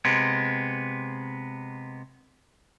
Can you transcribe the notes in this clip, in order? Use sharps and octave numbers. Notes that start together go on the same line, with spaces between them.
C3 G#3 B3